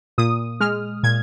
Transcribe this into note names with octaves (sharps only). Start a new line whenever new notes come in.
A#2 D#6
G#3 F6
A#2 G#6